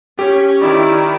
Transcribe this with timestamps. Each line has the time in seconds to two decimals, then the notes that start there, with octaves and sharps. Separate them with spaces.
0.19 C#4 G4
0.60 D#3 E4 D5